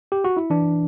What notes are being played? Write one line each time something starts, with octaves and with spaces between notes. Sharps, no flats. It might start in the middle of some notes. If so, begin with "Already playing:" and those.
G4
F#4
E4
E3 D4